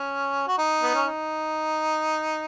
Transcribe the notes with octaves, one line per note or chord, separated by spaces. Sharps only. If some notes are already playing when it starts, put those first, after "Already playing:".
Already playing: C#4
F#4
D#4
B3
C#4
D#4